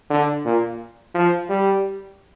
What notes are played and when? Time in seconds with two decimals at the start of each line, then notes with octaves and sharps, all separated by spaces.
0.10 D3
0.45 A#2
1.15 F3
1.49 G3